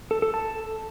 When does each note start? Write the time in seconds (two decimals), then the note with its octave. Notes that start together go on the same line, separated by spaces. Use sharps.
0.11 A4
0.22 A4
0.34 A5